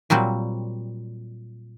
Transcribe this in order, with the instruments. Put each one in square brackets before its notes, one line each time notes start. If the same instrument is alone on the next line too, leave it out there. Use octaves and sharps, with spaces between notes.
[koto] A#2 F#3 G3 C4